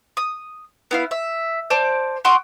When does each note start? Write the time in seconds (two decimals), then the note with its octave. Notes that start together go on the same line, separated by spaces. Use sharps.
0.17 D#6
0.91 B3 E4 F5
1.11 E5
1.70 C5 D5 A5 D6
2.25 F#4 C6 D6 D#6